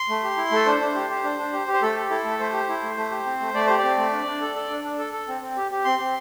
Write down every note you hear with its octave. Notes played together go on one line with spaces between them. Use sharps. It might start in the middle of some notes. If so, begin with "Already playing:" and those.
Already playing: C6
A3
G4
E4
A3 A4
D4 C5
D4
G4
G4
D4
D4
G4
G4
C5
A3 A4
G4
E4 A4
A3
A3 C5
G4
E4
A3
A3
G4
C4
A3
A3 D5
G4 C5
D5
C4
A3
D4
D4
A4
A4
D4
D4
A4
A4
C4
C4
G4
G4
C4 C6
C4